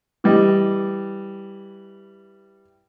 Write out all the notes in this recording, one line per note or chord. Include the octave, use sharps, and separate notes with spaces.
E3 G3 D#5